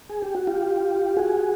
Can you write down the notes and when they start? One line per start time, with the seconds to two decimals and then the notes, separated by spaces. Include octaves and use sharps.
0.09 G#4
0.23 G4
0.35 F#4
0.47 F4 G4
1.17 F#4 G#4